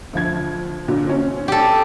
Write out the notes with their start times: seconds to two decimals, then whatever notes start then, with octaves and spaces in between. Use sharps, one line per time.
0.13 D2 F3 G#6
0.88 A#2 D3 F#3
1.07 C4 C#4
1.48 G4 A4